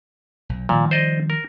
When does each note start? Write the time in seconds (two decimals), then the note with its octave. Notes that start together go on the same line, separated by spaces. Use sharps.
0.49 B1
0.69 A#2 D#3 F3 G3
0.91 C5 D5 D#5
1.30 A#4